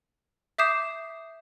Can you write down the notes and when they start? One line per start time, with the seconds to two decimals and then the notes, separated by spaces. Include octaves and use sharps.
0.58 E5 D6 D#6 G6 C7 E7